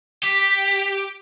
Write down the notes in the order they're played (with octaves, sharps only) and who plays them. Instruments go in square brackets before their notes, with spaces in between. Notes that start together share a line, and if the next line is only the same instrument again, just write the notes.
[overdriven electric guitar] G4 [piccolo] B6